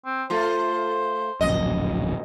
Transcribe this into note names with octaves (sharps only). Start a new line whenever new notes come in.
C4
A3 F4 C5
D1 A#1 F#2 D#5